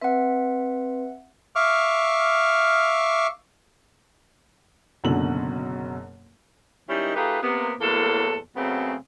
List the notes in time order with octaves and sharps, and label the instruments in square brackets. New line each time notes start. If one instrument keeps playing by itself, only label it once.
[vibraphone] C4 B4 [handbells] E5 F#5
[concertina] E5 F5 C#6 D6 F6
[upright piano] F#1 F#2 B2 D3 F#7
[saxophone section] D#3 G3 G#3 C#4 D#4 E4
A3 D#4 F4 G4 G#4 B4
C3 A#3 B3
E2 A2 F#3 A#3 A4
F#2 C#3 A3 B3 C4